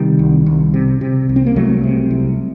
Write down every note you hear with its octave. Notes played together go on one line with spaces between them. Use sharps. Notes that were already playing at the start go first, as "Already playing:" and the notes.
Already playing: C3 D#3 G3
C2
C2
C3
C3
C2
C4
A#3
C2 F#3 A3
C3
C2